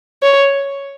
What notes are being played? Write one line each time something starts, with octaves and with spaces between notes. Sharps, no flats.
C#5